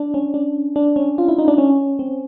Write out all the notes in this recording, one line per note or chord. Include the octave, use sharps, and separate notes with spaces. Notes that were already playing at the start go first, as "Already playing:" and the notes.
Already playing: D4
C#4
D4
D4
C#4
F4
E4
D#4
D4
C#4
C4